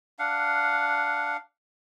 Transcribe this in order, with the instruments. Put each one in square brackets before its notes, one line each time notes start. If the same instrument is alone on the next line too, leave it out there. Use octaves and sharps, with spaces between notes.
[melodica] D4 F5 F#5